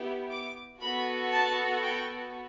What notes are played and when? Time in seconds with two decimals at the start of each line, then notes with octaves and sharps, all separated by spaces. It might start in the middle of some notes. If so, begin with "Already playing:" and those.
Already playing: B3 E4 G4
0.31 D6
0.82 B3 F#4 A4 B5
1.33 A5
1.83 G5